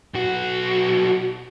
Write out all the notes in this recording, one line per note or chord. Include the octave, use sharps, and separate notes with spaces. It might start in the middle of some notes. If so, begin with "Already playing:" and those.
B1 F#4